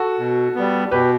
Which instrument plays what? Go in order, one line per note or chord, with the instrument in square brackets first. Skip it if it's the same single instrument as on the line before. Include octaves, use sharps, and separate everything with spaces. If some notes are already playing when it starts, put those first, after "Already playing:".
Already playing: [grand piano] F#4 A4
[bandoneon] B2
G3 B3
[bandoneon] B2 [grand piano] G4 B4